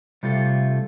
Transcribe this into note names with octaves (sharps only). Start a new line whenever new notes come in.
C3 G3 A3 F4 A4